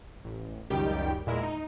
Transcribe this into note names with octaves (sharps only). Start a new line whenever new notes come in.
A1
C#2 F#2 D#3 G3 G4 G5
E2 A#2 G#3 E4 A#4
D#4